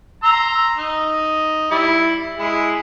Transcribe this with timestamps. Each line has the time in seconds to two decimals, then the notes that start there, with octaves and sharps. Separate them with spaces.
0.23 A#5 C6 E6
0.77 D#4
1.71 G3 E4
2.38 G#3 E4